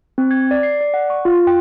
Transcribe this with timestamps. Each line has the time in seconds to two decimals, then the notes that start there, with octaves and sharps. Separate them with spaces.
0.18 C4
0.31 G#6
0.51 D5
0.63 C7
0.81 D5
0.94 F#5
1.10 C#6
1.25 F4
1.47 G5